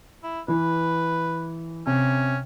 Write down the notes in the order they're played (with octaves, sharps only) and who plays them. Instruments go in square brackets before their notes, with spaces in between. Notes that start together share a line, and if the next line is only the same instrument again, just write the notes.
[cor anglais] E4
[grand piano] E3 [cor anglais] B4
[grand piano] C3 [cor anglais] C#4